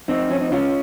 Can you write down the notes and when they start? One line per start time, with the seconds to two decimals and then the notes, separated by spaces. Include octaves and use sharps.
0.08 F2 C4 D#4
0.30 F3 C#4
0.41 D#4
0.51 C#3 C#4 F4